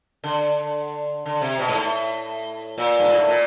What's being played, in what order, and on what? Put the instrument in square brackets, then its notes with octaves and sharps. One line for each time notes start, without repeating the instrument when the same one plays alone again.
[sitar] D3
D3
C3
B2
G#2
A2
A#2
G2
G#2
A2
A#2